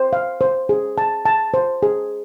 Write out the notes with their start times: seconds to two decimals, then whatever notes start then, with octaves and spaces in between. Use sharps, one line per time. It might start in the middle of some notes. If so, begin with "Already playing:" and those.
Already playing: C5
0.13 F5
0.41 C5
0.69 G#4
0.98 A5
1.26 A5
1.54 C5
1.83 G#4